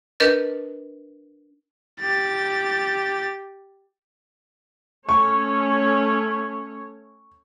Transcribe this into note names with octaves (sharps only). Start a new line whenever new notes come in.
D4 A#4 B4 D#5 G6 A6
G4 A6
A3 C#4 C#5 C#6